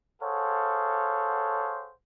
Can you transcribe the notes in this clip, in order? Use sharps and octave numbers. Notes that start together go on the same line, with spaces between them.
G#4 A4 C5 C#5 F5 F#5